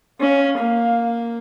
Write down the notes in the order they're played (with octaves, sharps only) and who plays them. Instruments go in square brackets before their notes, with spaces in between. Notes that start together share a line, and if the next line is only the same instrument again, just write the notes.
[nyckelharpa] C#4 [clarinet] F5
[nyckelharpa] A#3